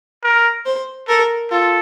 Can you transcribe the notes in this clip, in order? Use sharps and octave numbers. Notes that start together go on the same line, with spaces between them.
A#4
C5
A4 A#4
F4 A4